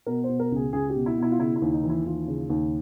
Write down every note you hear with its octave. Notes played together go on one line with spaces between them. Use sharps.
B2 A#4
C5
B2
A#4
C#2 G#4
C#2 G#4
G4
B2
E4
B2 E4
F4
C#3 E4
E4
D#2
D#4
E3
E4
D#2 F4
C#3
D#2